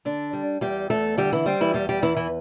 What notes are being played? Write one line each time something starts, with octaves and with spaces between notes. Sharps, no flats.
D3 D4
G3
E2 G3 G4
E2 A3 A4
D3 G3 G4
E3 E4
G3 C4
E3 E4
E2 G3 G4
G3 G4
E2 E3 E4
E3 E4